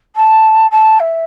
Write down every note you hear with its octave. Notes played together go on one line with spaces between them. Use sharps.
A5
A5
E5